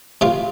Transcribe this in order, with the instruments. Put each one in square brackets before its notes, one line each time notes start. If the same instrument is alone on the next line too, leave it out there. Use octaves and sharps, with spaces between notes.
[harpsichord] C3 A3 F4